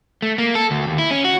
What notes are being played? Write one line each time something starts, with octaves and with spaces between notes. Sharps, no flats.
A3
A#3
A4
D2
D#2
E4
C#4
F#4